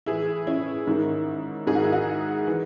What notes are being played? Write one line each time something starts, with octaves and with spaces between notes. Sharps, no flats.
A2 E3 E4 G#4
C#4 E4
G#2 D#3
G#2 D#3 G#4
F#4
E4
D#4 F#4
E3